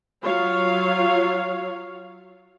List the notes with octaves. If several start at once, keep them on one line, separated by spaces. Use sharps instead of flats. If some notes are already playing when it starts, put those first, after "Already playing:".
F#3 F4 C#5 F5